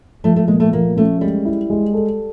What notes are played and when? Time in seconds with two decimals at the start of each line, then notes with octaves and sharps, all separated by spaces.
0.24 F3 A3
0.36 A3
0.48 A#2 G#3
0.60 A3
0.73 F3 A#3
0.96 A3 C#4
1.21 G3 G#3
1.45 E4
1.70 G#3
1.94 A4